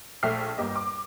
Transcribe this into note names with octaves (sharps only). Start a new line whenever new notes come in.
A#1 A3 E5 G5 F6 C7
G1 A#3 G4 D#5
D6